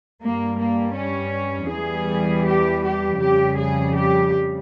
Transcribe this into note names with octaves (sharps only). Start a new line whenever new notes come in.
G2 G3 A#3
A#3
C#4
E2 E3 G3 G#4
G4
G4
F2 C#3 G3 G4
G#4
G4